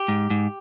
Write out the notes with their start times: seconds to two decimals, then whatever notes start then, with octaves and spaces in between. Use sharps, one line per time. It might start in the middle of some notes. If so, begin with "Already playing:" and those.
Already playing: G4
0.08 G#2
0.30 G#2